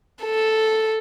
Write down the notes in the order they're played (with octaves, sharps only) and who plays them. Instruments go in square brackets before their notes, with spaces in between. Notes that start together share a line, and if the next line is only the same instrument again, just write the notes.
[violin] A4